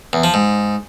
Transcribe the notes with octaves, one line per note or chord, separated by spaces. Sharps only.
E2
F3
G#2